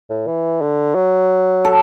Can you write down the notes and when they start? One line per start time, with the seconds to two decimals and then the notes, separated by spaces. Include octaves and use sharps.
0.10 A2
0.27 E3
0.62 D3
0.95 F#3
1.65 A4